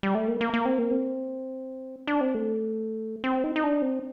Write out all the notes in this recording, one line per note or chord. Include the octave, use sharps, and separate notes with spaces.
G3
A3
A#3
A#3
A#3
C4
A#3
C4
D4
C4
A3
C4
D#4
D#4
D4
C4